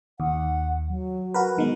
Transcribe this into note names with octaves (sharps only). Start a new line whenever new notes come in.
D#2 F#5
F#3
F#4 A#4 B4
D#3 G#3 B3